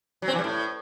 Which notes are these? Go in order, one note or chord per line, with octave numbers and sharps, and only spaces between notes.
F#3
C4
E3
G3
A2